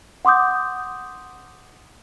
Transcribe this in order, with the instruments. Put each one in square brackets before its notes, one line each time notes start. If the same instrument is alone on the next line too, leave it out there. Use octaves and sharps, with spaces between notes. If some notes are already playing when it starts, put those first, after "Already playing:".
[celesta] F#5 C6 D6 D#6 G6